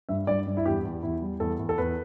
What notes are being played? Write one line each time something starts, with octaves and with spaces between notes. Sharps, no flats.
G2 E5
G2 D5
G2
E4
E2 G4
E2
E2 E4
G3
E2 A4
E2
A4
E2 B4